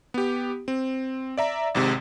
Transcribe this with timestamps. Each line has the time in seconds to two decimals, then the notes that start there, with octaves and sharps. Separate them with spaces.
0.14 B3 G4
0.68 C4
1.38 D5 E5 A#5
1.75 G#1 G#2 C3